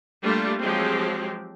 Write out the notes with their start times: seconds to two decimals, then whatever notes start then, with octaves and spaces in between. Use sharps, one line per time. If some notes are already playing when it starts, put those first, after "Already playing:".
0.24 G3 A3 A#3 D4 F4
0.62 F3 F#3 G#3 C4 G4